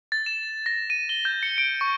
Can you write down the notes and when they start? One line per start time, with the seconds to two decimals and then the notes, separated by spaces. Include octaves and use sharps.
0.12 A6
0.26 E7
0.66 A#6
0.90 D#7
1.09 G7
1.25 G6
1.43 C#7
1.58 D7
1.81 C#6